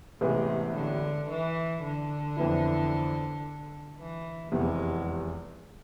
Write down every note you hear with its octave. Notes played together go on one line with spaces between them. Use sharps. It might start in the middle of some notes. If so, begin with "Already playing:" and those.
A1 A2 C3 E3 G#3 B3
D3
E3
D3
F2 E3 B3 E4
E3
F1 E2 C3 E3 G#3